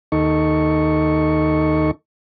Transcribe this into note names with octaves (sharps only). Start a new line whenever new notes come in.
D#2 D#4 A4 C#6